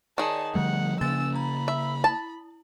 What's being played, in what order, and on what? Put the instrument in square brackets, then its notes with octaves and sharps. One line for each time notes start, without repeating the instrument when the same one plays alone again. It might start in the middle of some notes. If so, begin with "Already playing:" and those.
[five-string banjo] D#3 G#4 [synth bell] C#5 D5 F#7 [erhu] A5
[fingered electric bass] D3 G3 A3 [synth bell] F3 [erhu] F#5
[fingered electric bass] C#3 A#3 [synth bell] C#4 G#5 A6 [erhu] E6
[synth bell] A#5 [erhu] B5
[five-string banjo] E5
[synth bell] E4 [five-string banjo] A5